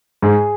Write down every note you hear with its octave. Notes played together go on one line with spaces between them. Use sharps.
G#2 G#4